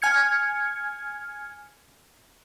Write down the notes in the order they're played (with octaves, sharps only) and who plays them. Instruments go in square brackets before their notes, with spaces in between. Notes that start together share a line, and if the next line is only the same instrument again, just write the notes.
[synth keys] G#5 F6 G#6 C#7